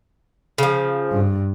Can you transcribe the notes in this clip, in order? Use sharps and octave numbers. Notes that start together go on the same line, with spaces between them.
C#3 F3
G2